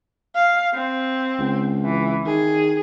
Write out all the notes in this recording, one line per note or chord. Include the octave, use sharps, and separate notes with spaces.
F5
C4
C#2
E3
D#3 G#4